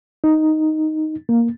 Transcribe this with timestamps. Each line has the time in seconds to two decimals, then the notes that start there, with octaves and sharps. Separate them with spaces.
0.24 D#4
1.29 A#3